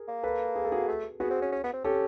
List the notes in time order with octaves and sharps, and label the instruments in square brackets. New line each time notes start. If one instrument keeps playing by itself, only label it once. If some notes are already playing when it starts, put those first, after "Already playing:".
Already playing: [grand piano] G#4 A#4
[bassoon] A#3
[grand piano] A4 B4
G#4
A4
F#4 G#4
[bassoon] A3
[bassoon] B3 [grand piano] F#4 G#4
[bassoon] C4
C#4
C#4
B3
C4
[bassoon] C#4 [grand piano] G4 A4